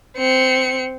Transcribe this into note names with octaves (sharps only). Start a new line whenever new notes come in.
C4 C#7